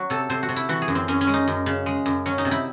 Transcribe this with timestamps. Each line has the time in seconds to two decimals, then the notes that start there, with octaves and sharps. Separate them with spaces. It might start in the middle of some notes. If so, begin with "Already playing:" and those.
Already playing: F#3 F#4
0.10 C3 A4
0.30 C3 C5
0.43 F#4
0.49 C3
0.56 E4
0.69 E3 F#4
0.82 G#4
0.88 F#2
0.95 C4
1.08 F#2 C#4
1.21 C#4
1.27 G#3
1.34 D#4
1.48 F#2
1.66 C#3
1.86 G#3
2.06 F#2
2.26 F#3 C#4
2.38 D#4
2.45 C3
2.51 E4